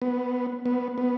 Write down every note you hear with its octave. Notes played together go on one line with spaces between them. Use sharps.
B3
B3
B3